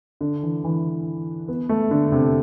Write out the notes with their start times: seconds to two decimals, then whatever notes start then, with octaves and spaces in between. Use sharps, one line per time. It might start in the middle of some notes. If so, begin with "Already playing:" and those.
0.21 D3
0.43 E3
0.64 E3
1.48 B3
1.69 A3
1.91 D3
2.12 C3